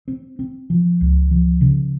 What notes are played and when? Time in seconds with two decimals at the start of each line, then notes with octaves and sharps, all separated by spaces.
0.08 C4
0.39 C4
0.70 F3
1.01 C#2
1.31 F3
1.61 C#3